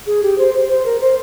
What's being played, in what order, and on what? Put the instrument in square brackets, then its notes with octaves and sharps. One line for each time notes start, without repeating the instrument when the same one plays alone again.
[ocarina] G#4
G4
C5
C5
C5
A#4
C5